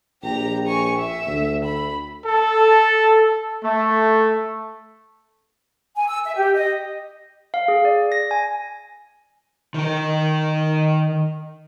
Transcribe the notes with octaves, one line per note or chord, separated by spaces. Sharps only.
A#1 G4 A#5
G#5 C#6
E5
D2
B5
A4
A3
G#5
E6
E5
G4
D#5
F5
G#4
D5
A#6
G#5
D#3 A#4